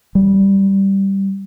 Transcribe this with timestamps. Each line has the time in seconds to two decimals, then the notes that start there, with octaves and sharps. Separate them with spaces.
0.15 G3